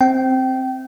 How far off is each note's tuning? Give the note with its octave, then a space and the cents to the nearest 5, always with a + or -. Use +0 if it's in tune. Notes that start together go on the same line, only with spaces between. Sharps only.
C4 +0 E5 +0 G5 -25